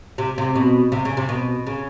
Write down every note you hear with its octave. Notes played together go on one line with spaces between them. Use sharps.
C3
C3
B2
C3
C#3
C3
B2
C#3